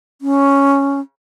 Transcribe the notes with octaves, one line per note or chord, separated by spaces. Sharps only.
C#4